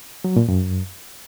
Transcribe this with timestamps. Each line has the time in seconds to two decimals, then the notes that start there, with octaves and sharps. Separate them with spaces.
0.24 F#3
0.36 A#2
0.48 F#2